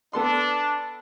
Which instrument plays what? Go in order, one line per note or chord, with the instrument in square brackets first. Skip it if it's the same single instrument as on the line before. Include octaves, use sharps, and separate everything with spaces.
[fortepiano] B3 A4 C6 [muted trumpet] D4